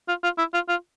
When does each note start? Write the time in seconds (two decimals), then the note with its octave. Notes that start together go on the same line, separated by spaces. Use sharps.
0.08 F4
0.23 F4
0.38 E4
0.54 F4
0.69 F4